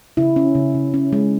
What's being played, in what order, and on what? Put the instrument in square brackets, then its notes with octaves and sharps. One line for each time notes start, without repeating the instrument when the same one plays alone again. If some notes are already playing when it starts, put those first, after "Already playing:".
[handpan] C#3 E4
C#4
C#3
C#3
C#4
G#3